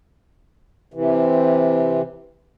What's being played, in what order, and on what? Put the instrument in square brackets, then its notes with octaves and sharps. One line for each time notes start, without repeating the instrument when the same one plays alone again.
[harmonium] C3 E3